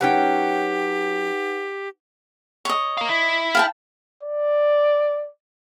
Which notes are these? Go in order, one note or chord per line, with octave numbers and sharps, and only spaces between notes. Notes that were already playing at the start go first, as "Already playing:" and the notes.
F#3 C#4 D#4 G4 B4 F#5 G5
C#5 D#5
A#4 F5
E4
F5 G5 A5
D5